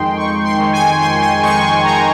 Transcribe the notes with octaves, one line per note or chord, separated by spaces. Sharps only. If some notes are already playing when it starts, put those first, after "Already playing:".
Already playing: F2 D#3 G#3 D#4 G5 C6
F2 C#6
C6
D#3 G#3 D#4
G#5
F2 C6
C6
D#3 G#3 D#4 C#6
C6
F2 A#5